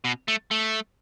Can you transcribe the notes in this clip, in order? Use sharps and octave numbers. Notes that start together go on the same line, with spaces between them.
B2
A3
A3